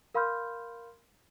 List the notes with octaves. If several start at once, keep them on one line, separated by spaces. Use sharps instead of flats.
A#4 F5 B5 C6 F6 G6